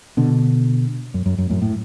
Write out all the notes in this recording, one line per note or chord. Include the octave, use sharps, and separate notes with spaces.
B2 D3
F#2
F#2
F#2
F#2 A2
A2